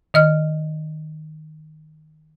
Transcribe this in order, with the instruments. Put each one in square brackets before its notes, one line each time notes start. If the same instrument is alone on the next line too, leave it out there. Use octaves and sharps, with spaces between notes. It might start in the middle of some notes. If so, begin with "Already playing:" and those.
[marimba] D#3 D#5 F6